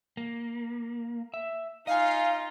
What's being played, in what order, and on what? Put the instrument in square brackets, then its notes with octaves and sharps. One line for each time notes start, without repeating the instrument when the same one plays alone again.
[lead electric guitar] A#3
E5
[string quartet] D#4 F4 [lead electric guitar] D#5 G#5 [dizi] F5